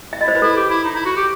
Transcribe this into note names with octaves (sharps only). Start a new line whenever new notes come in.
E5
E4 D#5
C5
B4
E4 A4
G4
E4
D#4
E4
F#4
G4